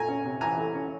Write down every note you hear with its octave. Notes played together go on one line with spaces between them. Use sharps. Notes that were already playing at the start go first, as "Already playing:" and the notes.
Already playing: A#2 A3 G#5 A#5
C#4
C3
E3 G#5 A#5
A3
C#4